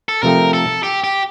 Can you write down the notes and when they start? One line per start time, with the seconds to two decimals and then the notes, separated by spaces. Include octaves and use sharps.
0.09 A4
0.23 C3 F3 A3 C4 A#4
0.53 A4
0.83 G4
1.04 G4